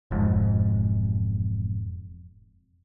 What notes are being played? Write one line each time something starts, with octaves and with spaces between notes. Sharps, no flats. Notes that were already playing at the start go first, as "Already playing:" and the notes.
E1 F2 G#2